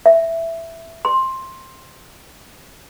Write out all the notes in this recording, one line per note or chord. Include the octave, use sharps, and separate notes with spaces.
E5
C6